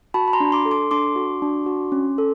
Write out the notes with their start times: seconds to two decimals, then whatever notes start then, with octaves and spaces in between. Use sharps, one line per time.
0.14 F#4 A5 B5
0.28 B5
0.33 A#5 C6
0.40 D4
0.52 C6 D6
0.65 A4
0.71 C6 D6
0.91 D4 C6 D6
1.16 F#4
1.42 D4
1.66 F#4
1.92 C#4
2.18 A4